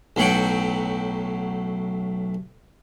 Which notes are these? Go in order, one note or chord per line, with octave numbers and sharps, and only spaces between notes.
B1 A2 F#3 F#5 G5